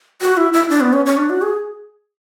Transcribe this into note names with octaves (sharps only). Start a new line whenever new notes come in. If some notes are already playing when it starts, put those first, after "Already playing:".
F#4
E4
E4
D4
B3
C#4
C#4
D4
F#4
G#4